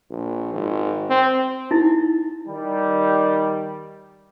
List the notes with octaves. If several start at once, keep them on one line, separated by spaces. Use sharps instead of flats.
A#1
G#1
C4
D#4 E4
D#3 G3